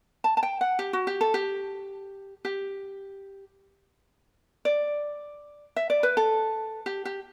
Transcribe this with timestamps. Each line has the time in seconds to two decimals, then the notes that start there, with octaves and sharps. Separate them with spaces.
0.24 A5
0.37 A5
0.43 G5
0.61 F#5
0.79 G4
0.93 F#4
1.07 G4
1.21 A4
1.34 G4
2.45 G4
4.65 D5
5.76 E5
5.90 D5
6.03 B4
6.17 A4
6.86 G4
7.05 G4